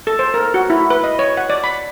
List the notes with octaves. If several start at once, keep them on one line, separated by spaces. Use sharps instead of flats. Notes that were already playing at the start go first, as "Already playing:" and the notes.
A4
C5
A#4
F#4
E4
B4
D#5
C#5
F#5
D5
B5